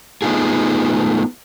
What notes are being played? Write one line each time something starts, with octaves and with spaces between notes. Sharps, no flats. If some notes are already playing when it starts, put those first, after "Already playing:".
A3 B3 D#4 F4 G#4